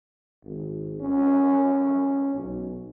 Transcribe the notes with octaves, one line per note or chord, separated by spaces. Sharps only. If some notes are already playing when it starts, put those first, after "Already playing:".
G#1
C#4
B1